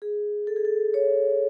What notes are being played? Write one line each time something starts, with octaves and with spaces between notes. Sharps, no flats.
G#4
A4
G#4
A4
C#5